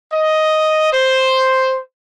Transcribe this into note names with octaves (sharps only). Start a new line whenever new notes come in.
D#5
C5